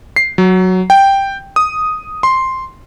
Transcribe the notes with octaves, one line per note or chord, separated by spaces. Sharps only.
C7
F#3
G5
D#6
C6